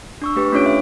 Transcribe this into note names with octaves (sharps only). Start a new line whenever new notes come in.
D4 C#6 E6
A3 G4 B4
A3 C#4 D4 F4 C#5 D7
E5